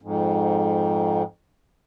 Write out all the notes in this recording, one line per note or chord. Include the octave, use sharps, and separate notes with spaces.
F2 G#2